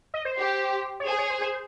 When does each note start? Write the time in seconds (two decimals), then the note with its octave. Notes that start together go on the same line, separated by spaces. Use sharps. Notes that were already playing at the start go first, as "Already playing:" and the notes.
0.14 D#5
0.25 C5
0.38 G4
1.00 C#5
1.07 G#4 C5
1.18 C#5
1.30 C5
1.42 C5